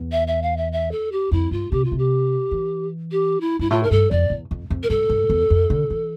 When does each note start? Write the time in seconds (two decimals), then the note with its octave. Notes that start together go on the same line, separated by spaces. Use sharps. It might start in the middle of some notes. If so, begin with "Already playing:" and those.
Already playing: E2
0.12 E5
0.27 E5
0.42 F5
0.57 E5
0.72 E5
0.91 A4
1.12 G4
1.31 F2 E4
1.51 G2 F4
1.72 C3 G4
1.84 F4
1.92 C3
1.98 G4
2.51 E3
3.11 G4
3.40 E4
3.59 G2 E4
3.70 A2 F4
3.83 A#4
3.91 G2 A4
4.11 F2 D5
4.30 E2
4.51 F2
4.70 F2
4.83 A#4
4.90 G2 A4
5.10 G2
5.30 E2
5.50 F2
5.70 D3
5.90 E3